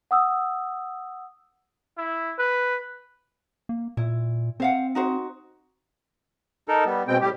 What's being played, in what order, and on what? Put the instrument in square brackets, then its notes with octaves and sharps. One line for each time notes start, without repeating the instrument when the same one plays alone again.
[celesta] F#5 D#6 E6
[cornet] E4
B4
[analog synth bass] A#3
[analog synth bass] A#2 [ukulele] E4
[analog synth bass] C4 [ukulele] C5 F5 F#5
[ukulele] D#4 F#4 C5
[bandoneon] D#4 A4 A#4
G3 B3
[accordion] B2 C4 G5 [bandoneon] G#3
[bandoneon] A2 [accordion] G3 G4